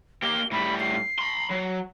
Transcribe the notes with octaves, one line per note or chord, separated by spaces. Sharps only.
A#3 G4 G7
A2 G3 B5
C7
B5 C6
F#3